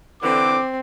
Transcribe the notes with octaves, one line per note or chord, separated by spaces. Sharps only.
D3 E3 C4 D6